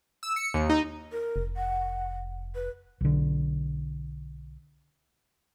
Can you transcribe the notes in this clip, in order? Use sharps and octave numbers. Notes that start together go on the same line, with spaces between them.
E6
C#7
D#2
D#4
A#4
F1
F#5
B4
B1 D3